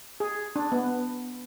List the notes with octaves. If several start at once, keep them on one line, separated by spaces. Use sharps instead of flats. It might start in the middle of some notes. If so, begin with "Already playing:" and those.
G#4
D4
B3